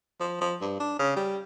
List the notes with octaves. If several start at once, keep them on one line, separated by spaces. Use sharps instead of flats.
F3
F3
G2
D4
C#3
G3